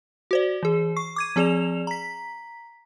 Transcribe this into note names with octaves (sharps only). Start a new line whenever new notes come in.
F#4 C5 D5
E3 G#4
C#6 C7
D6 G#6 D#7
F3 C4 G#4 D5 E7 F7
A#5 B6